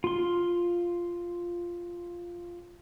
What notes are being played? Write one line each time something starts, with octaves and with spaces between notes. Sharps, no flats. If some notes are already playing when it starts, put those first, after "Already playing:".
F4 C6